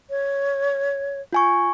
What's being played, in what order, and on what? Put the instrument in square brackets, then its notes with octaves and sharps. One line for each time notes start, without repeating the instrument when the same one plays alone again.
[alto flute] C#5
[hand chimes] F4 G#5 C#6